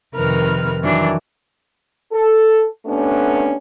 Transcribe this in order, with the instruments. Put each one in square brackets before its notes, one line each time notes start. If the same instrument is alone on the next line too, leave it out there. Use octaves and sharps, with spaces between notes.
[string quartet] F2 C3 D#3 A#4 B4 F6
F2 D#3 E3 F#3 D4
[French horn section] A4
C3 A3 B3 C#4 D4